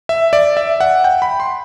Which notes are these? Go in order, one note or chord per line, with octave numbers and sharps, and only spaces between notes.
E5
D5
E5
F#5
G5
B5
C6